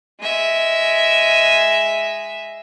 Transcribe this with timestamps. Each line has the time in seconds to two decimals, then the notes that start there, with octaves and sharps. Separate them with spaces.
0.20 G#3 E5